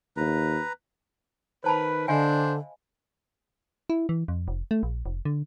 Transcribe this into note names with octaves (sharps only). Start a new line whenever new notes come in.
D#2 B4 A#5
D#3 B4 C5 A5 B5
D3 D4 C5 D#5 F5 G#5
E4
E3
F2
F1
A3
A#1
F1
D3